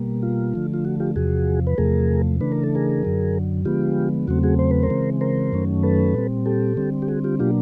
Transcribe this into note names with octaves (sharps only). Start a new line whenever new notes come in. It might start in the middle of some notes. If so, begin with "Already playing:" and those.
Already playing: B2 G3 A#3
F4
D3 F3 A3
F4
F#4
F4 G4
E2 C3 F3 F#4 G#4
B4
E2 C3 F3 A3 G#4 A#4
C#3 E3 A3 D4 B4
A#4
A4
G#4 A#4
F#2 D3 F#3
D3 F3 G#3 B3 F4 G4
E2 C#3 F#3 A3 C4 F#4
F#4 G#4
C5
B4
A#4 C5
C#3 E3 G#3 C4
A#4 C5
F#2 D#3 F#3 A3 C#4
A4 B4
A#2 G3 C4
G4 A4
D3 G3 C4
G4
F#4 G#4
F4 G4
B2 F#3 A#3 D4 F4 G4